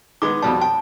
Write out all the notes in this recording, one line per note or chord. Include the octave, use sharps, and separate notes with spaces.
D#3 G#3 B3 D6
F2 B2 G3 A5
G5 A5